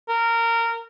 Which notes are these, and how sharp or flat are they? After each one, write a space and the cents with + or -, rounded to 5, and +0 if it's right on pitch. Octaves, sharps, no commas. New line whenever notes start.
A#4 -20